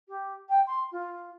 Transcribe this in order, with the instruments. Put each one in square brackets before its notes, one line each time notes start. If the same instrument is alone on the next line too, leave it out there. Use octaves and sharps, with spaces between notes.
[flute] G4
G5
C6
F4